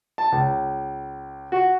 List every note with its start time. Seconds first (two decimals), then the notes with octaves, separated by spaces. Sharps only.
0.18 A5
0.32 C#2
1.52 F#4